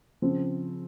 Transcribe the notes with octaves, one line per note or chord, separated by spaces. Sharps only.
C#3 F3 C4